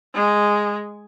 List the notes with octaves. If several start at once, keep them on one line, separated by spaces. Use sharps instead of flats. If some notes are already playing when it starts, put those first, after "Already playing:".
G#3